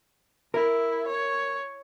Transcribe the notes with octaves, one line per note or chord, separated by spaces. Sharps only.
E4 A#4
C#5